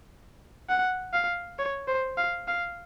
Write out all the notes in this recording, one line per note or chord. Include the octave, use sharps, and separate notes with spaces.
F#5
F5
C#5
C5
F5
F5